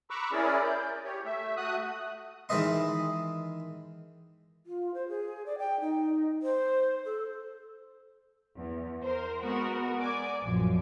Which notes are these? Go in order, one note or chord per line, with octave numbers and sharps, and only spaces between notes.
A#5 B5 C#6 D6 E6 F#6
C#4 E4 G#4 A#4 D5
G6
G4 C#5
A3 E5
A3 F#4 D#6 F#6
D#3 E3 G#3 B4 D#5 C6
F4
C5
G#4
D5
G5
D#4
C5
A4
E2
A#4 C5
G#3 B3 F#4 A#4
D5 G#5 D6
A#1 F#2 F3